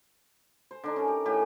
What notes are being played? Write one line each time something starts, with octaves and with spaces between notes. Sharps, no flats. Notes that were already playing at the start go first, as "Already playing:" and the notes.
C5
D3 D4 D#4
C#4 A#4
G4
A2 G4 G#5